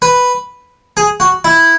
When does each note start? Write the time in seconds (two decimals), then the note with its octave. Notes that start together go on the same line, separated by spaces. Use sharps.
0.02 B4
0.97 G#4
1.20 F#4
1.44 E4